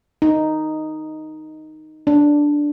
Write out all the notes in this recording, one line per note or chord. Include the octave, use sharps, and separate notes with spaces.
D#4
D4